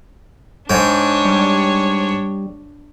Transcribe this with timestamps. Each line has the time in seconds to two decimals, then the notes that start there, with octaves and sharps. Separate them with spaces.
0.70 G#2 D4 C#5 G5
1.25 G3